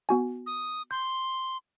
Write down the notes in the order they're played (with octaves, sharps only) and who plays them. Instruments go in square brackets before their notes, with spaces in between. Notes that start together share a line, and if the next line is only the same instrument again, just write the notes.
[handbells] B3 F#4 G#5
[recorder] D#6
[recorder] C6 [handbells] G6